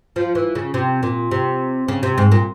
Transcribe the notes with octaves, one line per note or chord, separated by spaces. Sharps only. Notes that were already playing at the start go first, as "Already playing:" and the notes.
F3
E3
C#3
C3
A#2
C3
C#3
C3
G#2
A#2